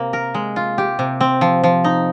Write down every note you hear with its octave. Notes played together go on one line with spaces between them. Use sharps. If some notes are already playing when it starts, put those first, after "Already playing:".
Already playing: C3 A#3
A#4
G#3
F4
G4
C3
C4
F3
F3
D#4